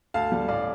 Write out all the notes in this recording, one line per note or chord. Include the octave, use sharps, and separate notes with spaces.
D2 F5 A5
D3 G3
A1 D5 F5